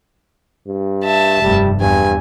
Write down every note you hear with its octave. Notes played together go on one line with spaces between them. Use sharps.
G2
E5 A5
F1 G2 G3
E2 G2 G#5